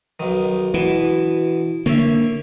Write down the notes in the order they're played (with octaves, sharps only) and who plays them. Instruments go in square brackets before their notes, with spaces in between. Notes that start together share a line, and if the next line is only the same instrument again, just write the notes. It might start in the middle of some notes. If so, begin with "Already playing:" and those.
[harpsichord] B1 D#3
[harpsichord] B2 [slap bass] E3
[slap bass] D3 A#3 [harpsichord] C#5 E5